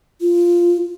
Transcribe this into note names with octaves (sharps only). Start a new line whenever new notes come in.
F4